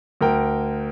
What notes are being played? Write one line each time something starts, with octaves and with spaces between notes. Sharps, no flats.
D2 A#4 G5